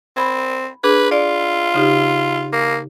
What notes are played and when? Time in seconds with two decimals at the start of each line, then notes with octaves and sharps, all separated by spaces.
0.17 C4 B5 G#6
0.84 D4 G#4 B4
1.11 F4 D5
1.74 C#3 D#4 G4
2.53 A#3